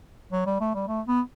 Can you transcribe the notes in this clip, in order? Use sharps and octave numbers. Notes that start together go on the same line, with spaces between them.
F#3
G3
A3
G3
A3
B3